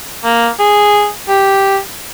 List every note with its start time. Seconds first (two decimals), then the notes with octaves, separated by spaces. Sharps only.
0.24 A#3
0.60 G#4
1.29 G4